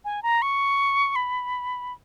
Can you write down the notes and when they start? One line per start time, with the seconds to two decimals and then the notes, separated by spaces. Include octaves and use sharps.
0.05 G#5
0.23 A#5
0.42 C#6
1.16 B5